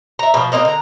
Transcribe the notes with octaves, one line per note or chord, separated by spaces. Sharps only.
E5 A#5
B2 F3
A#3 C4 D#5 A#5
D3 A#5